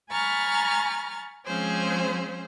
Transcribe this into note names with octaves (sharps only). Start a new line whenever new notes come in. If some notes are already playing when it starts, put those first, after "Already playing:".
G#5 A#5 B5 C#6 F6 A6
F3 G#3 C4 C#4 G#4 C5